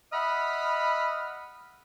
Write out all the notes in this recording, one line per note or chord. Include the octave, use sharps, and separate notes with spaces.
D#5 E5 F#5 B5 D#6 F6